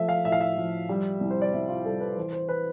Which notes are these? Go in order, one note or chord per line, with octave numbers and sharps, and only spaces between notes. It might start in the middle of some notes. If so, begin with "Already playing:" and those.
Already playing: F3 A3 E5
F5
A2 E5
F5
E5
F3
G3
C2
C5
D5
C2 E5
F4
G3 A4
B4
E3 C5
C5
B4